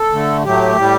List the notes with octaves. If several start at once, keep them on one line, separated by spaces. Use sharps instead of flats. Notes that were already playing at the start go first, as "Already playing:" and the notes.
Already playing: A4
D3 A3
A2 F#3 A3 G4
A2 G3